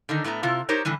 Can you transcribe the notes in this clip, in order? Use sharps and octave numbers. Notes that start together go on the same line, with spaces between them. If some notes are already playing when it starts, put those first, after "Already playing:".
D3 D#3 D#4
A2 A3 B3 A#5
C3 E4 F4
D#4 G4 A#4 C5 C#5
A2 D3 E3 G3